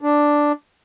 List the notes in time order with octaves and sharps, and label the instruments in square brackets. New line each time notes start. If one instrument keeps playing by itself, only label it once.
[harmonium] D4